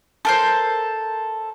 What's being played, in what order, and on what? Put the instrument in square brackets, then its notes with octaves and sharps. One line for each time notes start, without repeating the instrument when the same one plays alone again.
[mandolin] A4 A#4 C5